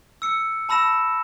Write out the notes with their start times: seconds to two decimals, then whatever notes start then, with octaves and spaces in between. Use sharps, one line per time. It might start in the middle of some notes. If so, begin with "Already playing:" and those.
0.22 E6 C#7
0.69 A5 B5 E6 A#6 E7